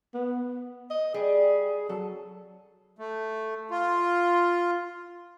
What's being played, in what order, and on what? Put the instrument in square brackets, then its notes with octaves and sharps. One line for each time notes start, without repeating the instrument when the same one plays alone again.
[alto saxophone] B3
D#5
[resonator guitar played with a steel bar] G3 [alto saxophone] G#4
[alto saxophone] F#3 [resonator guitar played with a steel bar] A4
[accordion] A3
F4